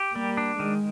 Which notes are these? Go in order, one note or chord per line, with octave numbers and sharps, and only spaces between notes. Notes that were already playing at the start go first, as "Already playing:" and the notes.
Already playing: G4
G3 A#3
D4
D#3 G#3